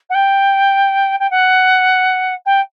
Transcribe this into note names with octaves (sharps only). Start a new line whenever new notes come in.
F#5
G5
G5
F#5
G5